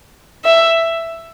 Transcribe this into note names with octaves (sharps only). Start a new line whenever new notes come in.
E5